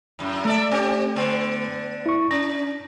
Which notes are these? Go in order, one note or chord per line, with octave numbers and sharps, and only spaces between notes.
F#2 A2
A3 A4 D5 E5
C4 G4
D3 B3
E4 C#6
C#4 A#6